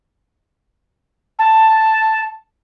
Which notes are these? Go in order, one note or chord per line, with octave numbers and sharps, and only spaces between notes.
A5